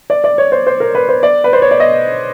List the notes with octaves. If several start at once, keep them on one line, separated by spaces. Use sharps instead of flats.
D5
D5
C#5
C5
C5
A#4
B4
C5
D5
B4
C5
C#5
D5
D#5